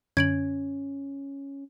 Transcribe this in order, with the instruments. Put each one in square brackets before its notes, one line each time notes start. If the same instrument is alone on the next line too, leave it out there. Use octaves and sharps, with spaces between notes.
[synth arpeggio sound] F#2 D3 [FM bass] C#4 [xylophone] G#6 D7 F#7